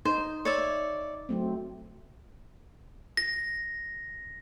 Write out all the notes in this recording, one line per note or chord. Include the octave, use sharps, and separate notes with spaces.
D#4 C5
C#5 D5 E5
F#3 A3 C4
A#6